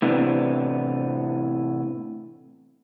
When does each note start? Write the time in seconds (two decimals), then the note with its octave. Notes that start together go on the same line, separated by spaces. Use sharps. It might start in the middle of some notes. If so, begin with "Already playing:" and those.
0.02 A2 C3 E3 B3 C4 D4